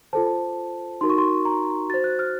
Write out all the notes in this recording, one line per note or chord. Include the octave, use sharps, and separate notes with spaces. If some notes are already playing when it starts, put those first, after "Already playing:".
F4 A4 C5 A5
D#4 F#4 A#4 C6
C#6
C6
A#5
F#4 C5 A6
F#6
F6